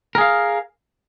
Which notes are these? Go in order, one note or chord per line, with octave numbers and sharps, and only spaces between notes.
G#4 A#4 F5